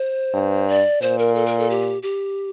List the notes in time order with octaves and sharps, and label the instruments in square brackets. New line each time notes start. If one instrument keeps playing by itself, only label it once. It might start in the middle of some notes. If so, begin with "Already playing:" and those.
Already playing: [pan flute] C5
[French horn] G2
[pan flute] D5
[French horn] A#2 [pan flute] C5
[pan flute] A#4
A4
A#4
A4
G4
G4